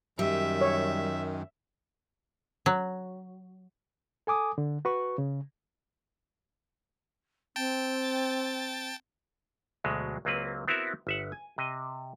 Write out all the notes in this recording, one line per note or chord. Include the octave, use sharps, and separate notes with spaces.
F#2 D#3 G3 E5
C#5
F#3
A4 G#5 D6 D#6
D3
F#4 B4 C#6
C#3
C4 G5 A5 A6
D2 B2 F#3 G#3
C#2 F#3 A#3 C4 B4
B3 C4 E4 F#4 A#4 E5
G1 E5 F#5
G#5
C3 D#5